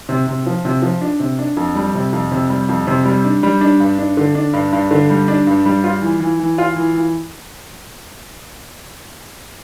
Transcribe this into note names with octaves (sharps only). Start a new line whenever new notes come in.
C3
C3
F3
C3
F3
D4
C3
D4
F2
G3
C3
F2
C3
G3
F2
C3
G3
D4
G3
D4
G2
D4
D3
D4
G2
G2
D3
G3
D4
G2
G3
F4
E3
E3
E3
F4
E3
E3